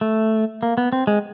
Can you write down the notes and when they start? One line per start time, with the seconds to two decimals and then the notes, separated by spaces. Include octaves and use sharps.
0.01 A3
0.63 A#3
0.78 B3
0.93 C4
1.07 G#3